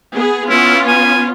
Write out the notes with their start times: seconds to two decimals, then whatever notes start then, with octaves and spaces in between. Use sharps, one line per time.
0.13 B3 G#4
0.50 B3 C#4 E4 F4
0.87 G#5